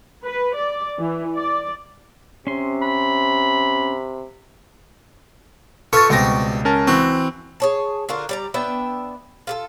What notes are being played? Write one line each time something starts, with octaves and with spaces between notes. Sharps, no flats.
B4
D5
E3
D5
C3 C#4 C6
B5
F4 A4 B4 C#5 C#6 A6
C#2 B2 G3 C4 A#6
C#4 A#4 A5
E3 C4 F#4
G#4 C#5 A5
D3 F4 F#4 A#4
G3 D5 A#5
B3 D4 E5 G5
F4 G4 A4